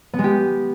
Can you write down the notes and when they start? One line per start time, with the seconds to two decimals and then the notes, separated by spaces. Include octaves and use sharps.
0.14 B3
0.19 G#3
0.24 G4